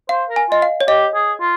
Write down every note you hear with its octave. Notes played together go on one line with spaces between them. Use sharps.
C5 F5
A#4
G#5
F4 D#5
F5
C#5
G4 D#5
G#4
F4